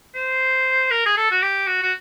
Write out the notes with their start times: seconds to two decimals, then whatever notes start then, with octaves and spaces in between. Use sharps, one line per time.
0.15 C5
0.91 A#4
1.06 G#4
1.17 A4
1.31 F#4
1.42 G4
1.67 F#4
1.82 F#4